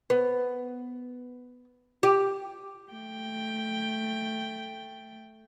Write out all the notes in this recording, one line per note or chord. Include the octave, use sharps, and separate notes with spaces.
B3
G4
A3 G5